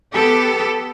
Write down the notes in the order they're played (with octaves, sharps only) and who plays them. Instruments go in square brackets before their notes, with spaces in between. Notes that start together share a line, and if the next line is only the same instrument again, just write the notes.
[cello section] B3 G4 A4